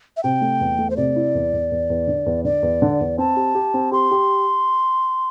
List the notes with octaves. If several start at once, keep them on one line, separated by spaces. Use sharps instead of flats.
E5
C3 G5
A3
E2
A3
C5
C3 D5
E4
E2
E2
E2
E2
D3
E2
D3 D5
E2
D3
E2
C4 A5
G4
G4
C4
G4 C6
G4